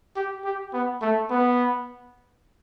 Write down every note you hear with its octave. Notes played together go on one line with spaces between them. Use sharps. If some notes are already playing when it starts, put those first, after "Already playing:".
G4
G4
B3
A3
B3